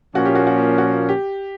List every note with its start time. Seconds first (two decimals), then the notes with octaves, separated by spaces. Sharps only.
0.15 A#2 F3 A#3 C#4 F#4
0.26 G4
0.35 F#4
0.47 F#4
0.78 F#4
1.09 G4